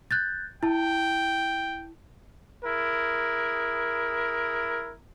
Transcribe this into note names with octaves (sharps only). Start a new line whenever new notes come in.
F#6 G6 A6
E4 G5 A5
E4 G#4 A#4